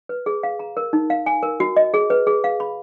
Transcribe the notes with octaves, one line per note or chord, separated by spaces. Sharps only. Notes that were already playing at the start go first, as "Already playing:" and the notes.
B4
G#4
F5
A#5
A#4
D#4
F5
G#5
A#4
F#4
D#5
G#4
B4
G#4
F5
B5